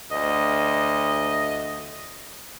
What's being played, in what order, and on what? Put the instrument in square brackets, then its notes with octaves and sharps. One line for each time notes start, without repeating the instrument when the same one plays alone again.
[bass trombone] D2 [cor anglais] D#5